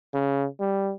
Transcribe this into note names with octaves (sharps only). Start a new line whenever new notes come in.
C#3
G3